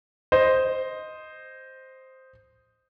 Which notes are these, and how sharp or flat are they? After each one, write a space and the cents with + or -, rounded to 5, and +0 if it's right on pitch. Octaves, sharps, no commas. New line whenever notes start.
C5 +0 D#5 +0